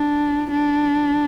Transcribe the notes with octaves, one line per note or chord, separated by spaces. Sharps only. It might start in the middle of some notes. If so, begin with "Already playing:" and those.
Already playing: D4
D4